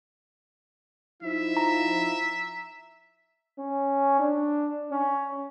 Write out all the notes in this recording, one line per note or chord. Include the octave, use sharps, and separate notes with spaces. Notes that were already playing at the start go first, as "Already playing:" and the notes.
F3 D#4 E4 E5
A#5
C#4
D4
C#4